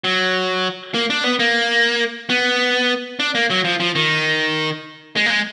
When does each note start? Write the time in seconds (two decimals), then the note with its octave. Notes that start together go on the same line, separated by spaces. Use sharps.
0.04 F#3
0.94 A#3
1.10 D4
1.24 B3
1.39 A#3
2.30 B3
3.19 D4
3.35 A#3
3.50 F#3
3.65 F3
3.80 F3
3.95 D#3
5.16 G#3
5.26 A#3
5.30 G#3